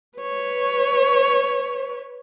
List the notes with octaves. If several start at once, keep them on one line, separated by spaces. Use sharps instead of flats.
B4 C#5